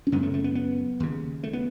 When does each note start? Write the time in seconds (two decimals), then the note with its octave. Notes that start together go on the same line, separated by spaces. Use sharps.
0.07 C#4
0.12 F#2 C#3 B3
0.23 A3
0.34 A3
0.44 B3
0.55 B3
1.00 D#2 C#3
1.43 A3
1.53 B3